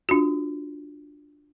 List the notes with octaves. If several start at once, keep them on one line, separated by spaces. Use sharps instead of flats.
D4 F4 F#4